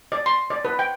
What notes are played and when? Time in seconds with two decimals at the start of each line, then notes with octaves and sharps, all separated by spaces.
0.12 D5
0.26 C6
0.50 D5
0.65 B4
0.79 G5